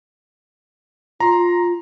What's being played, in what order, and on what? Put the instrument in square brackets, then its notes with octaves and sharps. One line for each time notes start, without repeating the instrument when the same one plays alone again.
[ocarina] F4 [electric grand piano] A#5 C6